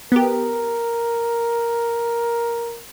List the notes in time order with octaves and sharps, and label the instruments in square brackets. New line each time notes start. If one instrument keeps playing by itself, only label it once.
[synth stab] B3 G4 [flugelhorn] A#4